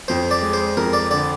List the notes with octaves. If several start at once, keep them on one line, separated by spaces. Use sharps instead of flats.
F2 C5
D5
G#3
C5
F2 A#4
D5
D3 D5